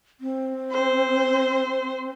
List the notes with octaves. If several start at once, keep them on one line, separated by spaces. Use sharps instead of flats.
C4
C5